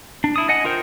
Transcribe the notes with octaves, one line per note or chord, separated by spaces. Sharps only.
D4
E4 D#6
D#5 F#5 G#5
F4 A#4 C5 G5